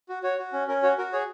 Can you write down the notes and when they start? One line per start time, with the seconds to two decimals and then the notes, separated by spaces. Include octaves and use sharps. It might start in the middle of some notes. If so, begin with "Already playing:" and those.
0.09 F#4
0.23 F#4 C#5
0.38 F#4
0.53 C#4
0.67 C#4 A#4
0.83 F#4 C#5
0.98 F#4 A#4
1.12 G#4 C#5